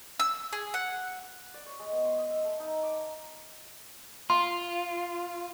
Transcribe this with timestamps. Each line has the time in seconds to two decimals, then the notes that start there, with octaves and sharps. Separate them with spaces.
0.20 E6
0.53 G#4
0.74 F#5
1.54 D5
1.66 C#5
1.79 G#3
1.92 B3
2.05 C6
2.18 D#5
2.30 E5
2.44 A3
2.59 D#4
2.83 D6
2.96 A#5
4.30 F4 C6